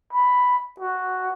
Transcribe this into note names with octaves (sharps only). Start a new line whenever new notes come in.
B5
F#4